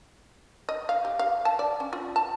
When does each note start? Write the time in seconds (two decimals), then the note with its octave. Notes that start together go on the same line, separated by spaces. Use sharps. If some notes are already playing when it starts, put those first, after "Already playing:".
0.69 D#5
0.89 F5
1.05 G4
1.19 F5
1.45 A5
1.59 D5
1.80 C#4
1.93 F4
2.16 A5